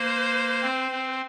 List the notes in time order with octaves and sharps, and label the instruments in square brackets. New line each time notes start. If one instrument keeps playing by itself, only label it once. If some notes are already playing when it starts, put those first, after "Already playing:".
Already playing: [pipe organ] A#3 [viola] C5
[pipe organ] C4
C4